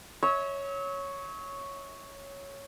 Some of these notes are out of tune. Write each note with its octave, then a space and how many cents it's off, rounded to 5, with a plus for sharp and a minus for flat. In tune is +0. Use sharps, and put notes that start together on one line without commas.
C#5 +0 E5 -40